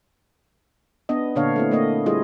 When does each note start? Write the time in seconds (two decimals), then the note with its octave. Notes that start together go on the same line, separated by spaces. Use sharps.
1.09 B3 D4 D#5
1.35 A#2 D3 D4 C#5 F5
1.56 A3 C4 E4
1.71 A3 A#3 D#5
2.06 G3 E4 F4 G#4 D#5